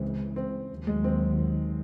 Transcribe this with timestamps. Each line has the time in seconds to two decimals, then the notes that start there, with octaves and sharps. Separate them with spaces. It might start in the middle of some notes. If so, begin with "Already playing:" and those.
Already playing: C#2 C#3 E3 G#3 C4
0.36 C4
0.70 D#2 D#3 F#3
0.87 G#3
1.04 C4